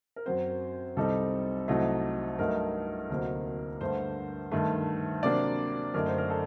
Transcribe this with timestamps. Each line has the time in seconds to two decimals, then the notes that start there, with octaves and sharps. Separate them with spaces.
0.16 A#4
0.26 F#2 F#3 C4 C5
0.96 C2 C3 G3 C4 D#4 A4
1.68 C2 C3 F#3 A3 D#4
2.39 G2 F#3 A3 D#4 A#4
3.10 D2 C3 F#3 A#3 D#4
3.81 G2 D3 A3 C5
4.52 G2 D#3 A3
5.23 C3 F#3 A#3 D4 D5
5.94 F#2 D3 A3 D#4 A#4
6.06 C5
6.18 A#4
6.30 A4